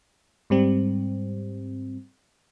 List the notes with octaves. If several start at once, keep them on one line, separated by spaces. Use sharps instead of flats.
G#2 G3 C4